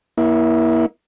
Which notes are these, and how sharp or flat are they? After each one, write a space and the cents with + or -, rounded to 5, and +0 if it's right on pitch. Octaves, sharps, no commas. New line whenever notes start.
A#3 +35 E4 -20